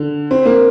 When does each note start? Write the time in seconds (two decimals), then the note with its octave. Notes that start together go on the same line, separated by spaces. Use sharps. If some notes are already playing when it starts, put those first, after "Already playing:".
Already playing: D3
0.31 C4
0.45 A#3